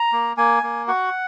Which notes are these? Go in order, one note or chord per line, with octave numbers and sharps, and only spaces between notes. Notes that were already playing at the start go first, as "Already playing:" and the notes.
Already playing: A#5
A#3
A#3 G#5
A#3
F#4 F#5